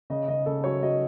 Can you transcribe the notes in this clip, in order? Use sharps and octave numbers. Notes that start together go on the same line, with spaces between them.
C#3 D#5
C#3 D#5
C#3 A4
F#3 C#5
F#3 D#5